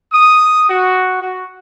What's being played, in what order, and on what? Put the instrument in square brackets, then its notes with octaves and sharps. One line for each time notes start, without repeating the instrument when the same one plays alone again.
[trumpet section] D#6
F#4
F#4